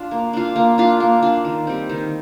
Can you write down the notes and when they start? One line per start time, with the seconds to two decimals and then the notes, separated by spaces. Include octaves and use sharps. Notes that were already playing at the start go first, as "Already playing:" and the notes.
Already playing: D4 F4
0.11 A#3
0.33 D4 F4
0.56 A#3
0.78 D4 F4
1.00 A#3
1.22 D4 F4
1.45 D#3
1.67 G3 C4
1.90 D#3